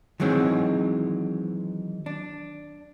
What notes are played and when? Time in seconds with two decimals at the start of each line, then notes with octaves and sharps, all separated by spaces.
0.20 D#3 E3 F#3 G#3 C4
2.06 D4